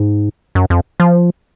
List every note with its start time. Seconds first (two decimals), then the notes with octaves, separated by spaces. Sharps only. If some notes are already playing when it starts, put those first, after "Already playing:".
Already playing: G#2
0.55 F#2
0.70 F2
1.00 F3